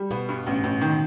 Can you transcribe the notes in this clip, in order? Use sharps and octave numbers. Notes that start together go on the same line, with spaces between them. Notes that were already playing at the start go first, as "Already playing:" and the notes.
Already playing: G3
B2 B3
G2
A1
A1
D#3